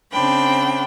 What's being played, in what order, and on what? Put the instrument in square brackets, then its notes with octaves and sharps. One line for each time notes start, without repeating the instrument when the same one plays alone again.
[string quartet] C#3 C4 D4 G5 B5